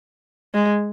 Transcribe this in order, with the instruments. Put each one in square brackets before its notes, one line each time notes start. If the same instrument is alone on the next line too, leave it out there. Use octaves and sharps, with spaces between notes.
[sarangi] G#3